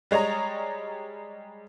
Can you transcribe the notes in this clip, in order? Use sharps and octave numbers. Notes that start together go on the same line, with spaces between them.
G3 G#3 C#5 D#5 A#5